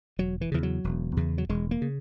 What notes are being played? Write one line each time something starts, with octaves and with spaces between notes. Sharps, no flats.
E1 F#3
E3
E2 C#3 E3
F#3
E1
E2 C#3
F#3
E1 G#3
A#3
C#3